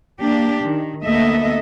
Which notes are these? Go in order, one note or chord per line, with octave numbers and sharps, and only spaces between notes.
A#3 D4 G4
D#3
D2 A#3 B3 A4 D#5 E5